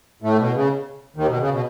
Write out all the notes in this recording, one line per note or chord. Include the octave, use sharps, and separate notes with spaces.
A2 A3
B2
C#3
D#2 D#3
B2
C#3
B2